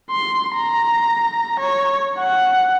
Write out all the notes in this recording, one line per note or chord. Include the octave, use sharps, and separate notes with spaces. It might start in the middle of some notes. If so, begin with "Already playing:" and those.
C6
A#5
C#5
F#5